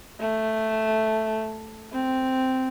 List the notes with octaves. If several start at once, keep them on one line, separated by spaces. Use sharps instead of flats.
A3
C4